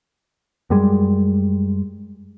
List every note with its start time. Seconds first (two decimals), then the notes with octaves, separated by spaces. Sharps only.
0.70 F#2 G3 G#3